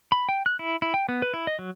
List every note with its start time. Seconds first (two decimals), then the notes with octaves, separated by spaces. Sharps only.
0.12 B5
0.29 G5
0.46 F#6
0.59 E4
0.82 E4
0.94 G5
1.09 B3
1.22 B4
1.34 E4
1.47 D#5
1.59 F#3